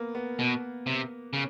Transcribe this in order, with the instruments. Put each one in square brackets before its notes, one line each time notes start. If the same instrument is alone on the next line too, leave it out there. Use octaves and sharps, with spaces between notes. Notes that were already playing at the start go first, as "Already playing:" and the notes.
Already playing: [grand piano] A#3 B3
B3
[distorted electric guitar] B2 [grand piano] B3
[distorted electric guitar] C3
C#3